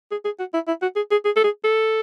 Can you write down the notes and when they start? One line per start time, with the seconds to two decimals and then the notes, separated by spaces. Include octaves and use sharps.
0.11 G#4
0.25 G#4
0.39 F#4
0.54 E4
0.68 E4
0.82 F#4
0.96 G#4
1.11 G#4
1.25 G#4
1.36 A4
1.44 G#4
1.64 A4